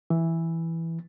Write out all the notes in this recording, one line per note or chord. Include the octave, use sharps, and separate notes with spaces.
E3